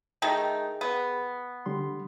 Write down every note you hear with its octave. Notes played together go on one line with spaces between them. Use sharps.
D#3 A3 D#4 G#4 G5
B3
D3 G3 C6